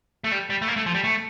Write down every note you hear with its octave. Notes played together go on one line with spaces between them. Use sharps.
A3
G3
G3
A3
A#3
A3
F3
G3
A3